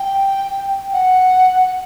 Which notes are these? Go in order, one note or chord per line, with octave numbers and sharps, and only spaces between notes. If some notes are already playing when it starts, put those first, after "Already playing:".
Already playing: G5
F#5